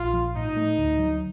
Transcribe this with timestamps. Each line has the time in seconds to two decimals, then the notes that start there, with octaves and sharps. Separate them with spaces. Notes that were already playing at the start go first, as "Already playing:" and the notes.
Already playing: A#1 F4
0.14 F3
0.35 A2 D#4
0.56 A3
0.78 D2
0.99 F#3